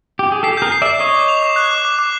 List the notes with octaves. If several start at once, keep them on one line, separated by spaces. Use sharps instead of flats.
G4
G#4
G4 A4 C7
G#4 A#4 G6
C7
D5 E5
C7
C#5 D#5 C7
D6
F7
D6
F#6
D6
D6
D6